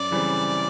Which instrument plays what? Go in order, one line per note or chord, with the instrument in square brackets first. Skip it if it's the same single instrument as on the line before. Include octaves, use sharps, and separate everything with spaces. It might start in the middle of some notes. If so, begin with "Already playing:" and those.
Already playing: [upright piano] F#2 [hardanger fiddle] D5
[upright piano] C#3 E3 G3 C4